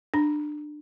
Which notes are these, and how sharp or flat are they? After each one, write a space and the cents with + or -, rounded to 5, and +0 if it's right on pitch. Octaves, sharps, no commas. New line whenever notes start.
D4 +25 A#5 +0